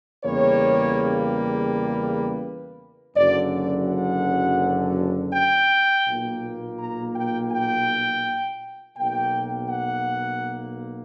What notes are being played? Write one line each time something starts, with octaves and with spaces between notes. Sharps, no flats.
E2 C#3 G3 A#3 C#5
B4
F#1 F#2 D3 D5
D5
F#5
G5
B1 A#2 A#3
A#5
G5
G5
B1 B2 A#3 G5
F#5